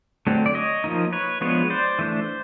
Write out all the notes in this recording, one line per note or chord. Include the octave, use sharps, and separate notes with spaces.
D3 F#3 A3 C4
D5
C#5 D#5
F3 A#3 D#4
B4 C#5
F3 G#3 B3 D4 B4 C#5
C5 D5
E3 A3 D4